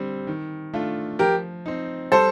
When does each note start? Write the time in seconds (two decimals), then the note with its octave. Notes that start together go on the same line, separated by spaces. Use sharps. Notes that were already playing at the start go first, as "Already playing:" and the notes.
Already playing: D3 G3 C4
0.27 D#3
0.74 A3 D4 F4
1.19 F3 G4 A#4
1.66 C4 D#4
2.12 G3 A4 C5